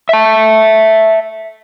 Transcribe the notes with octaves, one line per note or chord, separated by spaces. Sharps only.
E5 A5